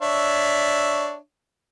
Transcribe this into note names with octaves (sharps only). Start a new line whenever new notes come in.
D4 C#5 E5